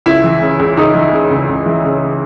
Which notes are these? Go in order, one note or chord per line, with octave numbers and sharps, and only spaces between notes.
C#2 E4
E3
C#3
C#2
C#2 D#4
E3
C#3
C#2
C#2
E3
C#3